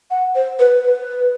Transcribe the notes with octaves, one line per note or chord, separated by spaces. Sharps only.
F#5
C5
B4
B4